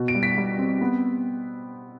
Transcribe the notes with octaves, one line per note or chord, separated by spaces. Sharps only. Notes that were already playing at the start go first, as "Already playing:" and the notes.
Already playing: B2
D7
G3
B6
G3
C4
B3